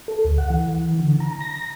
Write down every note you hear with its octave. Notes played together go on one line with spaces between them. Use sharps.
A4
D2
F#5
E3
D3
A#5
A#6